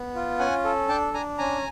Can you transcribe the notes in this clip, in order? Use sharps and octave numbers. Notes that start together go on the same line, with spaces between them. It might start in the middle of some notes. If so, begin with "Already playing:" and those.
Already playing: B3
F4
C#4 F#5 G#5
A4
D4 G5 A5
D4 G#5 A#5
C#4 G#5 A#5